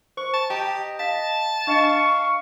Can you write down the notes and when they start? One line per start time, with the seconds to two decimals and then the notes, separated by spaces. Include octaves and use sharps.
0.17 C5 C#6
0.34 A5
0.50 G4 D#5 G5 A5 A#5
0.99 F5 A5
1.67 D4 D#5 F5 C#6